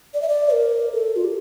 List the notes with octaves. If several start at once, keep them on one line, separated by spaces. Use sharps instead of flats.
D5
E5
D5
A#4
A4
F4
G4